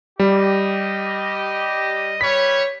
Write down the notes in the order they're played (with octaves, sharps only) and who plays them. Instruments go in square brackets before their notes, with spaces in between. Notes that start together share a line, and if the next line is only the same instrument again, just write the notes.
[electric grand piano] G3 [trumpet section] G4 D#5
[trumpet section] G3 B4 C#5 [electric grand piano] B6